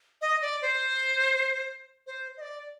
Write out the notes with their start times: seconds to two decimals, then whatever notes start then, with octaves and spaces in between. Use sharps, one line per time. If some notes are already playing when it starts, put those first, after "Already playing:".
0.21 D#5
0.42 D5
0.62 C5
2.07 C5
2.37 D#5
2.41 D5